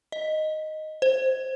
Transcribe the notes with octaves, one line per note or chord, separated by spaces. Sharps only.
D#5
C5